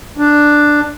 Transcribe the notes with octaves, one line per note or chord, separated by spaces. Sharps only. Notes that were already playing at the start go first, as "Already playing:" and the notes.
D4